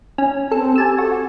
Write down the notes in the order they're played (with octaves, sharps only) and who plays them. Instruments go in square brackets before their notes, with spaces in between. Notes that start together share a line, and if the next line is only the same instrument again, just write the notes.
[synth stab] C#4
[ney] C4 [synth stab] A4
[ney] G4 [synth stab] G#5 A5 E6
[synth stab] F#4 [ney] A4